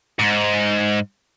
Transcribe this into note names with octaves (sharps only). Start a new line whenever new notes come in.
G#2